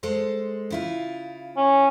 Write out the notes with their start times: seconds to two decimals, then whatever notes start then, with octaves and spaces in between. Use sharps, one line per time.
0.03 G#3 A4 C5
0.70 C#3 E4 F4
1.57 C#4